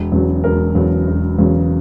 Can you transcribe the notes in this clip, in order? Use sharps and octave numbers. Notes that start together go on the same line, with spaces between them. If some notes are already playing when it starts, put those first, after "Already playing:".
Already playing: E1
E2 C#3 F#3
E1 A#4
E2 C#3 F#3
E1
E2 C#3 F#3